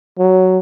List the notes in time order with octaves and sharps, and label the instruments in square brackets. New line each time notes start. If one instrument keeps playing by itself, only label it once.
[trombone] F#3